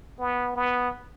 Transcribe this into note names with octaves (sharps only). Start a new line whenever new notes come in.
B3
B3